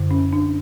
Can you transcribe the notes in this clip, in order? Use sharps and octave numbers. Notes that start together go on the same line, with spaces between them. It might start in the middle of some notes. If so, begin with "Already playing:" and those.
Already playing: F#2 D3
C#4
D4